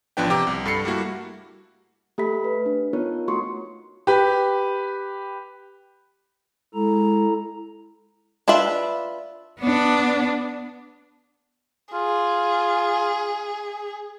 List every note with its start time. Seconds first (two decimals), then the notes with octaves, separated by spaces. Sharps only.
0.17 A1 F3 B3 D4 B4 G5
0.30 C3 G4 G5 A#5 D6
0.47 C2
0.66 G2 A4 B5 C7 C#7
0.85 G3 A3 A#3 E4 F#4
2.18 A3 G4 A4 E5 B5 B6
2.44 B4
2.66 D4
2.93 B3 D#4 F4 A#4 C#5
3.28 A3 F#4 C6 C#6
4.07 G4 B4
6.74 G#3 E4 A4 A#5
8.48 D4 F4 B4 E5 B5
9.60 B3 D4
11.93 F4 G#4